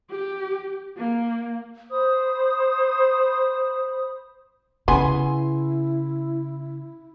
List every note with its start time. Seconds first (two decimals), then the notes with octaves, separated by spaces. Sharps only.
0.10 G4
0.97 A#3
1.91 C5 B5 D#6
4.88 C#3 B3 E4 G#5 C6